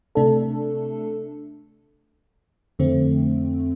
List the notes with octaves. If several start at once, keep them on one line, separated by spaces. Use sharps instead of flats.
C3 A3 D4 A4
F2 D3 A3 C4